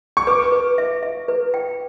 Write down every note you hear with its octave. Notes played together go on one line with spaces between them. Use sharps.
C#6
B4 D6
B4
E5
E5
B4
G5